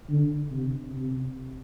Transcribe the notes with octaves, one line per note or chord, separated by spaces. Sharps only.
D3
C3
C3